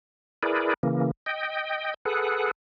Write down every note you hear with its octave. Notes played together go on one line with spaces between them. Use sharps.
E4 G#4 A#4 B4 D5
C#3 E3 A#3
D#5 G5
G#4 A4 B4 F#5